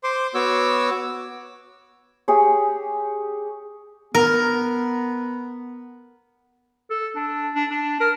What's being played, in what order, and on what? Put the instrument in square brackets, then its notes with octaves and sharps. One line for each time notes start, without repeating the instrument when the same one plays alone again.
[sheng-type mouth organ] C5 C6 D6
B3 F#4 C#5 D6 E6
[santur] G4 G#4 C#5
[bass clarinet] B3 [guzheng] A#4
[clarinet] A4
D4
D4
D4
A#4